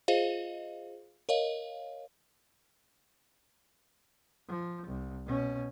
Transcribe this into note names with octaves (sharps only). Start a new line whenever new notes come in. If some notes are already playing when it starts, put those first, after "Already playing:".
F4 G#4 C5 D#5 F5
A#4 C#5 D#5 F5
F3
C2
B2 C#4